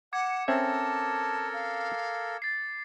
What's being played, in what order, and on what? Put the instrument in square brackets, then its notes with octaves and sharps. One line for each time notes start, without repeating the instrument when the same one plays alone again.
[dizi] F#5 [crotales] D6 G#6 C#7
[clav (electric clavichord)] C4 C#4 E5 [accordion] A4 A#4 [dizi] A5 [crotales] G#6
[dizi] F5
[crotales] A6 C7